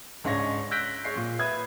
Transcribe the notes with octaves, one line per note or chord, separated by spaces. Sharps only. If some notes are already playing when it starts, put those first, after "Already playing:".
C#2 G#2 C#4 D4 C#5 A#6
E6 F#6 G6 A#6 B6 D7
G#3 C#5 C7
A#2
B4 E5 D#6 G#6